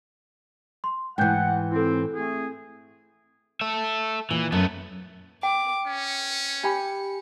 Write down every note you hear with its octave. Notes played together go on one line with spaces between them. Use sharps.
C6
G#2 E3 F#5 G5 G6
C4 E4 A4
A3 C4 G#4
A4 E5
A#2 E3
F#2 A3 B3
G5 D6
C#4 C#7
G4 G#5 B5